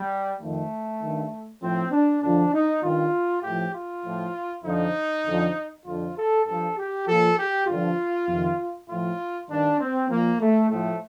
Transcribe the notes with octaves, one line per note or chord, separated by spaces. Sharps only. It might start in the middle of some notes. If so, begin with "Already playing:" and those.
Already playing: G3
F2 D#3 A3
G2 D#3
A2 F3 C4
D4
F2 D3 F3 D4
D#4
G2 D#3 F4
A2 F3 G4
F4
A2 F3
F2 D3 F3 D#4
F2 D3 F3
F2 D3 F3 F4
A4
G2 F3 A4
G4
A#2 F3 A4
G4
G2 D3 F3 F4
F2 C3 D#3
A2 F3 F4
G2 D#3 D4
C4
A#2 F3 A#3
A3
A2 F3 A3